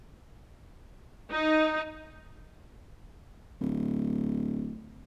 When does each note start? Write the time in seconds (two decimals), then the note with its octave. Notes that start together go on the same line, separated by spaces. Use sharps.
1.32 D#4
3.60 D1